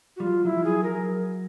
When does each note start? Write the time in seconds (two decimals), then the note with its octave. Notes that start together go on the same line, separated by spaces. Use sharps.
0.16 F#4
0.20 G3 F4
0.26 F#3
0.45 F#3 E4
0.57 F3
0.64 F#3 G#4
0.83 A#4